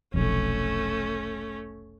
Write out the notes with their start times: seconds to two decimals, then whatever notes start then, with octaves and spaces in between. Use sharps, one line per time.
0.14 F1 B1 F2 A3 C#4